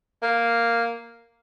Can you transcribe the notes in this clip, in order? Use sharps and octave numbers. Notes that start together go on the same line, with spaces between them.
A#3